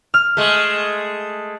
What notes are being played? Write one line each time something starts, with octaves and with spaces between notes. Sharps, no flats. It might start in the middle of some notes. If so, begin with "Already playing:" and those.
F6
G#3 A3